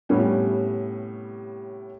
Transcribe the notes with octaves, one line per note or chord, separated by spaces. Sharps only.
A2 C3 G3 B3 C#4